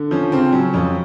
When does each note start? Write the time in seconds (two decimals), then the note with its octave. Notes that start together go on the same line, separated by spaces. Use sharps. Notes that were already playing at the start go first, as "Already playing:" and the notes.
Already playing: D3
0.11 F3 C#4
0.32 C#3 C4
0.52 F#3 C#4
0.74 F2 C#4